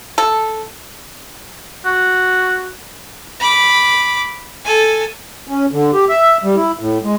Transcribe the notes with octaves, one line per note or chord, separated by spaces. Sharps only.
A4
F#4
B5 D6
A4 G#5
C#4
D3
G4
E5
G3
E4
A2
G#3